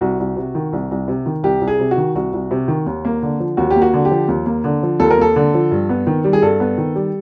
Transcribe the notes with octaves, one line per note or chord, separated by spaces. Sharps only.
C2 F#4
C2
C3
D#3
C2
C2
C3
D#3
C2 G4
C2
G#4
C3
F#4
D#3
C2 F#4
C2
C3
D#3
D#2
A#3
D3
F3
D#2 F#4
G4
A#3
F#4
D3
G4
F3
D#2
A#3
D3
F3
D#2 A4
A#4
A#3 A4
D3
F3
G2
B3
D#3
G3
G#4
G2 A4
B3
D#3
G3